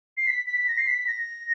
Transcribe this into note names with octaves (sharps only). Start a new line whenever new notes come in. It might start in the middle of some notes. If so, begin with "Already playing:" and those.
C7
B6
B6
B6
A#6
C7
B6
B6
A#6